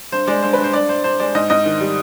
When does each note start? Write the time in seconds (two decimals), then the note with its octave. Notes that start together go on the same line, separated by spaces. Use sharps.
0.12 G2 C5
0.27 G#3 D5
0.42 G2 C5
0.53 G2 B4
0.64 C5
0.73 G2 D5
0.89 G2 C5
1.04 G2 C5
1.20 G#3 D5
1.35 G#2 D#5
1.50 G#2 D#5
1.66 D#3
1.80 G3